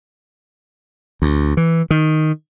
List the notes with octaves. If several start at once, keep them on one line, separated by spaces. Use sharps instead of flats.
D2
E3
D#3